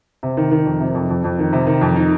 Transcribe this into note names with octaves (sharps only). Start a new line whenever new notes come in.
C3
D#3
D#3
F2
C3
F2
F2
F2
D#3
C3
D#3
F2
D#4